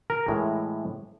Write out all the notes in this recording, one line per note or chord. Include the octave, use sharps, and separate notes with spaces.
A#4
A2 E3 G#3